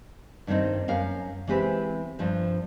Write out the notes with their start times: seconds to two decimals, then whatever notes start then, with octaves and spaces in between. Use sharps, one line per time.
0.47 G2 D#3 B3 C4 D#4
0.88 F#2 A#4 F5
1.47 E3 G#3 C4 G4 B4
2.19 G2 F3 C4